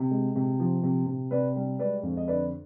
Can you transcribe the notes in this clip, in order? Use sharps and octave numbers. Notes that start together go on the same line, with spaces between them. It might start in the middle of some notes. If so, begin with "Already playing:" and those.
Already playing: C3
G#3
C3
F3
C3
C3
C3 B4 D5
G3
G#3 B4 D5
F2
D#5
D3 B4 D5